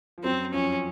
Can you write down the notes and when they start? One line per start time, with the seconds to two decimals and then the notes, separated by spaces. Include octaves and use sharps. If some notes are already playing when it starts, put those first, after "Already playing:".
0.18 F3
0.24 F#2 F#3 C4
0.53 F2 F3 C#4